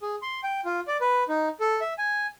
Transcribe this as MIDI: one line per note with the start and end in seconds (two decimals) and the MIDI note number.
0.02 0.16 68
0.22 0.41 84
0.43 0.61 79
0.65 0.80 65
0.88 0.97 74
1.01 1.23 71
1.29 1.49 63
1.60 1.80 69
1.81 1.93 76
1.98 2.27 80